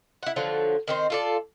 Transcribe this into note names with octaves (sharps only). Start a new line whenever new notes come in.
E4 F#5
D3 F3 F#3
D#3 C4 C5
F4 A4 D5